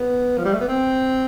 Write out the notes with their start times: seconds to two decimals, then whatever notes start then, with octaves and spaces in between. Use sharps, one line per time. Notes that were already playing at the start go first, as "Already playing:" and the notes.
Already playing: B3
0.38 F3
0.45 G3
0.53 A3
0.61 B3
0.68 C4